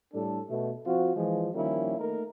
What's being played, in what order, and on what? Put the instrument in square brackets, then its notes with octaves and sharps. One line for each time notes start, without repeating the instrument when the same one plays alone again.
[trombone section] A2 G3 D4 A4
B2 A3
F3 C4 F4 F#4
E3 F3 G#3
D#3 F3 G3 A#3 C#4 E4
A3 A#3 D#4 A#4